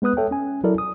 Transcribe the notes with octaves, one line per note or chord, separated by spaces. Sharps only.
G#3 B3 B4 D#6 F#6
A4 C#5 E5 G5
C#4 G#5
F#3 E4 A4 A#4 D5
D#6